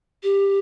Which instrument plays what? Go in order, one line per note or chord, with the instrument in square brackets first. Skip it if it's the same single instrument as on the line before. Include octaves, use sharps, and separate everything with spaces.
[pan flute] G4